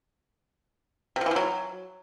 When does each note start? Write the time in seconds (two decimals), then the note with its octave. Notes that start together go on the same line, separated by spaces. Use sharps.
1.16 C3
1.21 F3
1.26 E3
1.31 F3
1.36 F#3